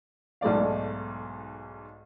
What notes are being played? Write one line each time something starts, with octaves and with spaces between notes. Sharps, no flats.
B1 G#2 A3 D5 F5